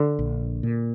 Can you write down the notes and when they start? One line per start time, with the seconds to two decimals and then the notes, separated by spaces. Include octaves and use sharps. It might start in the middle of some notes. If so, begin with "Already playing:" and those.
Already playing: D3
0.19 A#1
0.63 A#2